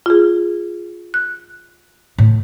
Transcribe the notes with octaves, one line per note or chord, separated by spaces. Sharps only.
F4 G#4
F#6
A2 A3